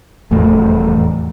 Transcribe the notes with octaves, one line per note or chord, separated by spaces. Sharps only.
F1 E2 A2 A3